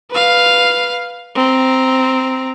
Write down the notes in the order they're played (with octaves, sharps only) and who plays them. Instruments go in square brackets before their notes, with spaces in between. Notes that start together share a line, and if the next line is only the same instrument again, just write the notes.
[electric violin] B4 F5
C4 A#5